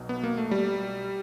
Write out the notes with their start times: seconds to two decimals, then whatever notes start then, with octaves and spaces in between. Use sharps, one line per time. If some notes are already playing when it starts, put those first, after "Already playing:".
Already playing: B1 B2
0.09 B3
0.23 A#3
0.37 A3
0.51 G3